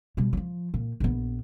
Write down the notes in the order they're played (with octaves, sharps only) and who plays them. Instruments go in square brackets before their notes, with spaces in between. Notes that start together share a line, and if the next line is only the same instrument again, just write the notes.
[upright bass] B2 G3
F3 F#3
A#2
A#1 B3